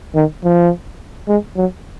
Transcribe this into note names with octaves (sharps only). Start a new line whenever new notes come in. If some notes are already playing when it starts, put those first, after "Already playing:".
D#3
F3
G#3
F#3